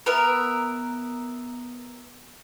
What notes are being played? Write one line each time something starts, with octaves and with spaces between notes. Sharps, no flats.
B3 A#4 E5